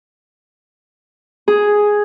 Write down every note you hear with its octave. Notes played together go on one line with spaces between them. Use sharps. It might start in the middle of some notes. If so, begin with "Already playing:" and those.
G#4